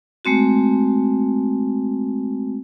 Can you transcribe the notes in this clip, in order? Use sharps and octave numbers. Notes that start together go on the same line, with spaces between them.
G#3 A3 C4 F#4